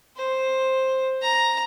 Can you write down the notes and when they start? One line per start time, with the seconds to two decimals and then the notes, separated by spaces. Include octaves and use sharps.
0.16 C5
1.22 A#5